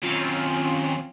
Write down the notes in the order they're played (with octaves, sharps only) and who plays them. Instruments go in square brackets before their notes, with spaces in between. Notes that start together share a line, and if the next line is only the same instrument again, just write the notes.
[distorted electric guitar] D#2 F#3 [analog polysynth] C4 C#4 F4